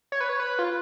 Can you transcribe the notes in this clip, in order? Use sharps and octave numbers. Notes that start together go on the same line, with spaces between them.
C#5
B4
C#5
B4
F4